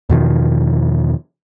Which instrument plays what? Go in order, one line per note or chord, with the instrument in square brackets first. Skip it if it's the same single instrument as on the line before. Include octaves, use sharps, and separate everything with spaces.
[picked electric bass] E2 B2 D#3 F3